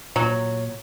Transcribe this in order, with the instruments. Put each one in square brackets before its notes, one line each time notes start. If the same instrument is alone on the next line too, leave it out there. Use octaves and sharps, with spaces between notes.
[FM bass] A#2 [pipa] F#3